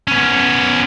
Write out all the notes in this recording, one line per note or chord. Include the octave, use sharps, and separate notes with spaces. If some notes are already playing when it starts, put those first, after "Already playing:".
B3 C#4